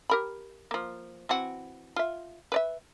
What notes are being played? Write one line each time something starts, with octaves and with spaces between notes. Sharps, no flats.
G4 A#4 B5
F3 A#3
E3 C4 F#4
F4 E5
B4 D5 E5